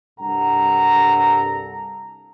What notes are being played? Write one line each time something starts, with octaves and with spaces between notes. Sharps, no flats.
C2 G2 A4 F#5 A#5